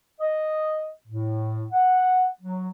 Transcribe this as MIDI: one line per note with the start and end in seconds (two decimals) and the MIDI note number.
0.20 0.87 75
1.07 1.66 45
1.73 2.26 78
2.41 2.69 54